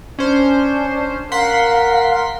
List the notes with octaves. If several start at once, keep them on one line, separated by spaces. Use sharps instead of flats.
C#4 D4 C5
A#4 F5 F#5 C6 B6